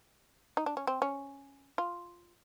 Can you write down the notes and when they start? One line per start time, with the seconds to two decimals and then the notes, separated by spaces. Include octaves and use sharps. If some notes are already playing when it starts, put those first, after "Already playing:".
0.57 D#4
0.66 D4
0.77 C#4
0.87 C4
1.02 C#4
1.78 F4